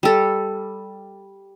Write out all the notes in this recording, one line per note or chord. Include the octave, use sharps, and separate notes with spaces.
G3 A4